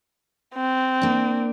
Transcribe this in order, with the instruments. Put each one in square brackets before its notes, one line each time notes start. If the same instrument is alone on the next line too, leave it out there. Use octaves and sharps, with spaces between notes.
[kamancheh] C4
[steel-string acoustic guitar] A#3 D4